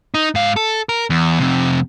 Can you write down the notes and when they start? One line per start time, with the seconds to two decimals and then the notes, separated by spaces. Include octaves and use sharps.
0.14 D#4
0.35 G#2 F5
0.56 A4
0.89 A#4
1.10 E2
1.39 F2 C3